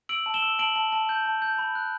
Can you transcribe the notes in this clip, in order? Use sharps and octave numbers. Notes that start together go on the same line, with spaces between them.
E6 D7 F#7
A5
E7 G7
E6
A5 D7 F#7
A5
A5
G6
A5
G6
B5
F#6